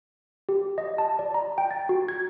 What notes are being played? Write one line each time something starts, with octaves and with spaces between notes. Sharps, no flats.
G4
D#5
A5
D5
A#5
G5
A6
F#4
G#6